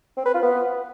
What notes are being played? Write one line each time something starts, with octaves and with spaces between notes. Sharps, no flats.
C4
B4
F4
B3